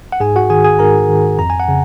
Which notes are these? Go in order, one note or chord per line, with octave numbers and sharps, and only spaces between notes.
F#5
G#2 G#4 G#5
F#4 F#5
D#3 G#4 G#5
G#4 G#5
G#2 A#4 A#5
D#3
F2 A#5
G#5
F#5
C#3